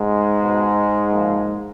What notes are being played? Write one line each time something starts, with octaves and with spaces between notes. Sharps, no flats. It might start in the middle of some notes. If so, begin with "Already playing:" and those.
Already playing: G#2 G#3
B2
A#2 F3